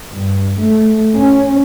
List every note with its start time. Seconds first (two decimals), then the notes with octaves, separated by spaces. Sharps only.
0.12 G2
0.61 A3
1.16 C#4